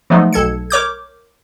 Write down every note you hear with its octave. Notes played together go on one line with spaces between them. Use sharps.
F3 F#3 G#3 A3 B3 D#4
B1 A4 G#6 C#7
A#4 C#5 D6 G6